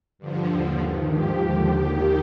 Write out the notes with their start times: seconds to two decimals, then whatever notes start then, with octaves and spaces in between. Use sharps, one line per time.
0.19 G2 D3 F3
0.49 D#2 D3 F3
0.80 G2 D#3
1.10 G#2 F3 G4
1.40 D#2 D3 F3
1.71 D#2 D#3